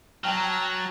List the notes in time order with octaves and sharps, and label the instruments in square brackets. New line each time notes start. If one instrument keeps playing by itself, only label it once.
[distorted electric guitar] F#3 [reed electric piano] G5 F6 [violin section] A5 A#5